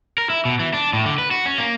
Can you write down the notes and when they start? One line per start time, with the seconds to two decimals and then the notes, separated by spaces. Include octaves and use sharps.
0.18 A#4
0.30 E4
0.45 B2
0.59 E3
0.74 D4
0.93 A2
1.06 D3
1.18 B4
1.31 F#4
1.46 C#4
1.58 A#3